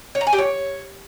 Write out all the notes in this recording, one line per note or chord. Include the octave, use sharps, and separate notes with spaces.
C#5
A#5
G#5
G4
C#5